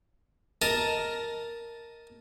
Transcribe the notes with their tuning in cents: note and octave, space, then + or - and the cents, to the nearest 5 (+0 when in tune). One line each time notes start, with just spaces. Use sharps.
A#4 +0 D#5 +10 A5 -5